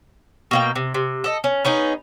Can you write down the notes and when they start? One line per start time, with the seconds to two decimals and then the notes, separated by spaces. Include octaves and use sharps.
0.51 B2 A#3 G5
0.76 C3
0.94 C3
1.24 A4 D#5
1.44 C#4
1.65 B3 C#4 D#4 G#4